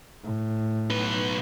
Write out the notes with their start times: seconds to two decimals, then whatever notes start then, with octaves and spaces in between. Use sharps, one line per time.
0.23 A2
0.90 B1 B4